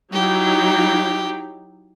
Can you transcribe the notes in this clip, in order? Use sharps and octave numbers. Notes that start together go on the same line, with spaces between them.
F#3 D#4 E4 G4